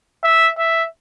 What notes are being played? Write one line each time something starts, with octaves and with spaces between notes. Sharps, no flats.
E5
E5